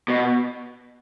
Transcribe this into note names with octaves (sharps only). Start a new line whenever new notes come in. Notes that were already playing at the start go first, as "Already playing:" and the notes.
B2